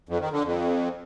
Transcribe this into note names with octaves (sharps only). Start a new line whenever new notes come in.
F2
D#3
D3
F2